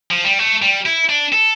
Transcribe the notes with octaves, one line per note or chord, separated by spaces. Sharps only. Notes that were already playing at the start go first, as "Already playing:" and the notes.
F3
G3
A3
G3
E4
D4
A4